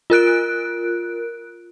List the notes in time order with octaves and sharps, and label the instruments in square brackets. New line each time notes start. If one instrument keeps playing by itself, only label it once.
[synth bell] F4 A#4 F#6 D7